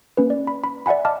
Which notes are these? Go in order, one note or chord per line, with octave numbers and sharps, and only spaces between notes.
A#3 C#4 B4
D5
B5
B5
D5 E5 F#5 G#5 B5
D#5 F5 A5 D6 F6